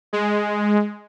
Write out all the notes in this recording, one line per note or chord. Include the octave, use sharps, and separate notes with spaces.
G#3